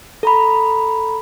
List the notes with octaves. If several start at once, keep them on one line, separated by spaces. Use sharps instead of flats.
A4 A#5 B5